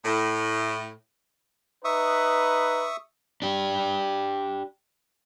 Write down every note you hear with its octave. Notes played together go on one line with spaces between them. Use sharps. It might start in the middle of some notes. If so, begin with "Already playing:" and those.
A2
D#4 B4 E5 C#6 D#6
D4 G4